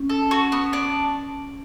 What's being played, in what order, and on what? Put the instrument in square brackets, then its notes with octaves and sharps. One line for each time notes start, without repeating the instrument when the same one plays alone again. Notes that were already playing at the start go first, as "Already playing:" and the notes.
Already playing: [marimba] C#4
[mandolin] A4
F#4
B3
D4